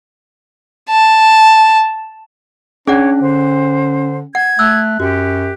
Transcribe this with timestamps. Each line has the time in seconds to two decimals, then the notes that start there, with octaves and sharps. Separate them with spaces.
0.90 A5
2.87 C#4 D4 G#4 C#5 D5 F#5
3.21 D3 C5
4.35 F#5 G#6
4.59 A3 E6 F#6
5.00 F#2 F#4 G4